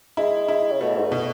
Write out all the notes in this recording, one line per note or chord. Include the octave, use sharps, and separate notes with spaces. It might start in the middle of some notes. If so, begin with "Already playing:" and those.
G#3 E4
E4
C#3
B2 A3
G#2
E2
B2